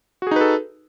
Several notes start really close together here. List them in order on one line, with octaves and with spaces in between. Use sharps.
F#4 G#4 D#4 B4 A4